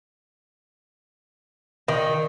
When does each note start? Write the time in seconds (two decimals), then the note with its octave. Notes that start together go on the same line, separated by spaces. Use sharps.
1.88 D#3